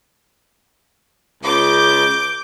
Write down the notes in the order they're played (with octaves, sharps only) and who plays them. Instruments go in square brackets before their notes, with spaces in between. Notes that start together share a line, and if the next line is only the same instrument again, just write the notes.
[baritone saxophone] C#2 [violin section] D6 G6